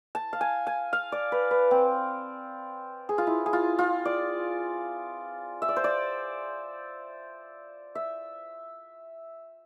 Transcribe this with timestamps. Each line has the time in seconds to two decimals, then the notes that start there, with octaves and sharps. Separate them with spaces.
0.15 A5
0.33 F5
0.41 G#5
0.67 G#5
0.93 F5
1.12 D5
1.32 B4
1.51 B4
1.71 C4
3.09 G#4
3.18 F4
3.27 E4
3.46 G#4
3.53 F4
3.79 F4
4.05 D5
5.62 E5
5.69 D5
5.76 C5
5.84 D5
7.95 E5